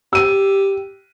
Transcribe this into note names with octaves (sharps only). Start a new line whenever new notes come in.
G4 E6 D#7